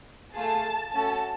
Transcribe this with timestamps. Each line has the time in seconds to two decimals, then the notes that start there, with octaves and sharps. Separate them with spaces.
0.34 A3 F4 G#4 A5
0.93 A3 C#4 F#4 A4 A5